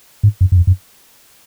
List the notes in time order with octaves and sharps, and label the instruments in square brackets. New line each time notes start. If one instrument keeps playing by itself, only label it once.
[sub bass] G#2
F#2
F#2
F2
F#2